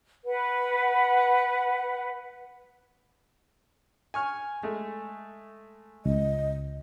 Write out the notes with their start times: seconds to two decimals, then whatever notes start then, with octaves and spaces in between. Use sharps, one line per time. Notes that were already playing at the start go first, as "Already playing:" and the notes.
0.24 B4 F#5
4.14 G#5 C#6 F6
4.63 G#3 A3
6.06 C#2 D#5